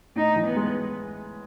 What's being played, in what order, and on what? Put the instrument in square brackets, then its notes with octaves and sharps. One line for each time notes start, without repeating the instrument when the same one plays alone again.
[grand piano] A2 [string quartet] D#4
[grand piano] E3
[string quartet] B3
[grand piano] G#3